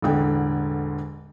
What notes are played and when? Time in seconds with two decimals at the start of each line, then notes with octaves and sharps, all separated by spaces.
0.02 E1 A1 D3 G5